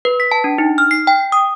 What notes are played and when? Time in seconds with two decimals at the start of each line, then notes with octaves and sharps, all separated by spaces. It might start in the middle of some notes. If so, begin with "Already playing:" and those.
0.05 B4
0.20 B6
0.32 A5
0.44 D4
0.58 D#4
0.78 F6
0.91 C7
1.07 G5
1.32 D#6